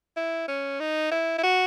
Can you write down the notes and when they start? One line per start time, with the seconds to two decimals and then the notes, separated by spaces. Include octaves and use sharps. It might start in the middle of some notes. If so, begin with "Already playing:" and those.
0.16 E4
0.48 C#4
0.80 D#4
1.11 E4
1.38 E4
1.43 F#4